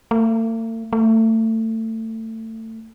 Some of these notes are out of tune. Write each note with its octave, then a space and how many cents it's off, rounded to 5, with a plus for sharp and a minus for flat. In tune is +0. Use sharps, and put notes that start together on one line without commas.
A3 +45
A3 +25